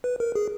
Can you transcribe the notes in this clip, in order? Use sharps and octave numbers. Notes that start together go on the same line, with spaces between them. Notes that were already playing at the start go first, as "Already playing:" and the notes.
B4
A#4
G#4